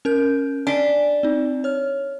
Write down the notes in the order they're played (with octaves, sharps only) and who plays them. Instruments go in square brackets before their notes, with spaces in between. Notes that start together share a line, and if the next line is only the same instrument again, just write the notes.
[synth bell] C#4 A#4 G6
[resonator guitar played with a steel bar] D4 [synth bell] G#5 B6 G7
[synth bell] C4 D#4
C#5 F6